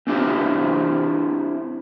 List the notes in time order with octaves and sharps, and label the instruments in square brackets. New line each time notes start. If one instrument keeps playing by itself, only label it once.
[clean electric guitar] C4 D4 E4 F4 G4 C5